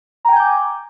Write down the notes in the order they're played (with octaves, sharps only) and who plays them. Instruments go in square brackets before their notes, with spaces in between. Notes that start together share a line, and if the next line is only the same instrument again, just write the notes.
[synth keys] A#5
G5
G#5
G6
D6